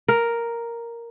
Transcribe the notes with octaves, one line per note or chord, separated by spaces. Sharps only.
A#4